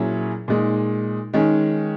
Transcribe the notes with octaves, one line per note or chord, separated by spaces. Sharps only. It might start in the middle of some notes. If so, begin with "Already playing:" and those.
Already playing: A#2 F#3 C#4 E4 G#4
A#2 G#3 D#4
D#3 G#3 C#4